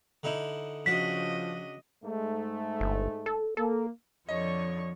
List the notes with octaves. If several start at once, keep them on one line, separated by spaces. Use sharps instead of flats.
D3 D#4 E4
C#3 F3 D4 F#4 D#5 B6
G#2 A3
G1
A4
A#3 A4
F2 D3 F3 C#5 D#5 C#6